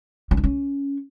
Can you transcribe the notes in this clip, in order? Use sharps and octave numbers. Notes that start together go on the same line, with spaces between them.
C#4
D4
C#4